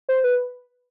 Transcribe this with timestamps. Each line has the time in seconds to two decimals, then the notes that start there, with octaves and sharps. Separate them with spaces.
0.09 C5
0.24 B4